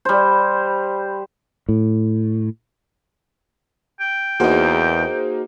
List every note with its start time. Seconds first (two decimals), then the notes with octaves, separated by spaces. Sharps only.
0.05 G3 C5
1.69 A2
4.00 G5
4.40 E2 A#3 D#4 F#4 G#4 C5